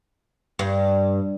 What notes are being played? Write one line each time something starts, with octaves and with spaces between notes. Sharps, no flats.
G2